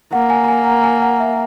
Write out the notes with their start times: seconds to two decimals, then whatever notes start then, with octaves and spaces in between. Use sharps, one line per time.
0.13 A#3 F#5
0.30 G#5
0.44 A#5
0.48 G#5
0.66 F#5
0.84 G#5
1.02 F#5
1.20 E5